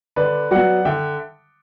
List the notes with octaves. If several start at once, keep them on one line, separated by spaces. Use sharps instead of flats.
D3 B4 D5
F#3 B3 D5 F#5
D3 E5 G5